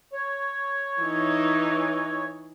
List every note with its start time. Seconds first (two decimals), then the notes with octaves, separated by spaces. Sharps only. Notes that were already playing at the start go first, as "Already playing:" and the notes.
0.12 C#5
1.02 E3 D#4